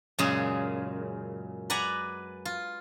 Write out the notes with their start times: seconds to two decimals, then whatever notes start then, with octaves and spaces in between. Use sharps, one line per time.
0.19 F#2 A#2 C#3 G#3 G#4
1.70 B4 D5 F#5 G#5 A#5
2.45 F4